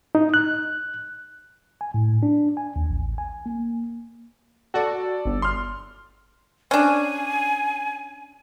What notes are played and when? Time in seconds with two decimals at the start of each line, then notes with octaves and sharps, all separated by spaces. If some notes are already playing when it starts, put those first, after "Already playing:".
0.15 D#4
0.34 F#6
1.81 G#5
1.94 A2
2.23 D4
2.57 G#5
2.76 D#2
2.90 A1
3.18 G#5
3.46 A#3
4.74 F#4 A4 D5
5.25 G1
5.42 C6 F6
6.71 C#4 D4 G#5